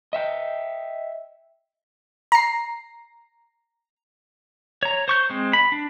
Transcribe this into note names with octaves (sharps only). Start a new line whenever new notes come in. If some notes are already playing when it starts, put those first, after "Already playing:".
D#5 E5 G5
A#5 C7
C#5 A#5
C5 C#6 G6
G#3 C4
B5
D4